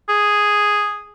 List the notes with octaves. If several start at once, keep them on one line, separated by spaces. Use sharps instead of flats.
G#4